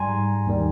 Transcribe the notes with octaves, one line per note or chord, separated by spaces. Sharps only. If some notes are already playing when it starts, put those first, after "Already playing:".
Already playing: G#2 G3 G#5 A#5 C6
D#2 D#3 G3